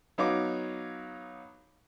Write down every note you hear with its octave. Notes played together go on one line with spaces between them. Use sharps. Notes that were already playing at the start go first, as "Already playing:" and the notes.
F#3 B3 D#4 C#5 F5 D6